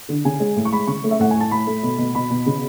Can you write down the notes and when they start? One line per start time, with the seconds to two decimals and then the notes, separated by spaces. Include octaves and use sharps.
0.09 D3
0.25 C#3 G#5
0.40 G#3
0.56 A2
0.65 C#6
0.72 G#3 B5
0.87 C#3 C#6
1.04 A3
1.11 E5
1.20 A2 F#5
1.31 A2 G#5
1.41 A5
1.51 A2 B5
1.67 A3
1.83 B2
1.98 B2
2.15 B2 B5
2.30 B2
2.46 C#3